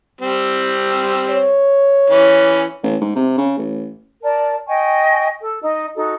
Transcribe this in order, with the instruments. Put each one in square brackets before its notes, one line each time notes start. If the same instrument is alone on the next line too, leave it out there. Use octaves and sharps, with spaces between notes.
[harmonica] G3 C4
[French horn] C#5
[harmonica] E3 C#4
[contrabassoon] A1
G#2
C3
C#3
A1
[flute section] A#4 D5 A5
D#5 G5 G#5 C#6
A4
D#4 D#5
D#4 F#4 A4